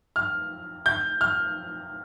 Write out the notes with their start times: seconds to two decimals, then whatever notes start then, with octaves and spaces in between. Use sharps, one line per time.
0.16 F6
0.86 G6
1.21 F6